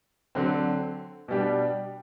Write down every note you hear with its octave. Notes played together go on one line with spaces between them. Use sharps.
D3 F#3 C4 F#4
B2 G3 D4 G4